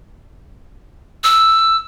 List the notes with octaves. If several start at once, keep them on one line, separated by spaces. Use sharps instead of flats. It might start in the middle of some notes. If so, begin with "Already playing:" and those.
E6